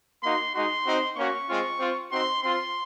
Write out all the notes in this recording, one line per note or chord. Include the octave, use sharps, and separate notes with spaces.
A#3 D#4 F#4 C6
G#3 D#4 F#4 C6
C4 D#4 F#4
A#3 C#4 F#4 C#6
G#3 C4 F4
C4 F4
C4 D#4 F#4 C6
C4 F4 C6